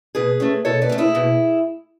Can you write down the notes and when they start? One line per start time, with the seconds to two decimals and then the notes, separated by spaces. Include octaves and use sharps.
0.15 B2 G#4 B4
0.40 A3 C#4
0.65 B2 A4 C#5
0.81 B4 D5
0.89 A3 C#4
0.98 E4 G#4
1.15 B2